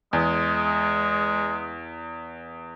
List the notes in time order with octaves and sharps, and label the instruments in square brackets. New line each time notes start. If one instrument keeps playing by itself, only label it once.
[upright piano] E2 [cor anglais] G#3